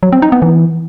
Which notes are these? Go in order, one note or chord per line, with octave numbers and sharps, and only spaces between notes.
F#3
C4
D#4
B3
E3